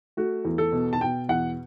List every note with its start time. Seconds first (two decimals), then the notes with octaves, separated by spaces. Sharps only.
0.17 A3 F#4
0.45 E2
0.58 A4
0.73 B2
0.93 A5
1.00 B2 G5
1.29 E2 F#5